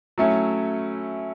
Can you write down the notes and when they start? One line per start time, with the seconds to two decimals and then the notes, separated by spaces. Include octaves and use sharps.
0.18 F#3 A3 C#4 E4